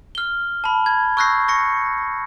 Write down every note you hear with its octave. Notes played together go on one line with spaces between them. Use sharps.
F6 G7
A5 B5
G#6
C#6 E6 F#6 G6 A#6 C7
C#6 A#6 C#7